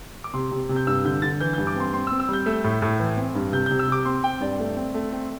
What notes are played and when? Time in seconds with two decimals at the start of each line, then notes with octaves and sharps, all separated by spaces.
0.24 D6
0.34 C3 C6
0.52 C3
0.69 C3
0.76 G6
0.87 G2 E6
1.05 D3 G6
1.22 D3 A6
1.41 E3 G6
1.53 G2 G6
1.67 D6
1.76 C4 C6
1.93 C4 C6
2.07 E6
2.11 C4
2.20 E6
2.29 G3 G6
2.46 A3 E6
2.64 A2
2.82 A2
3.00 E3
3.17 C4
3.35 G2
3.53 C3 G6
3.66 C3 G6
3.79 E6
3.88 C3 D6
4.06 C4 C6
4.23 C4 G5
4.41 G2 D5
4.59 A3
4.77 C4
4.94 A3
5.12 C4